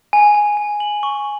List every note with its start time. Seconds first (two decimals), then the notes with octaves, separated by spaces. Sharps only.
0.13 G#5
0.35 G#5
0.57 G#5
0.80 F#7
1.03 C#6